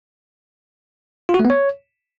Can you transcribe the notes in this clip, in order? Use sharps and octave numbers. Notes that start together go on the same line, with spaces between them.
F4
F#4
A3
B3
C#5